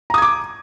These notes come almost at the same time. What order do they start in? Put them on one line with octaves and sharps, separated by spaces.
A#5 D#6 G#6 D6